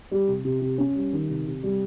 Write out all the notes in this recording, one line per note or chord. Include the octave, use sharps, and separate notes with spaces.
G3
C3
C3
C3
C#4
G3
D#3
C3
C3
G3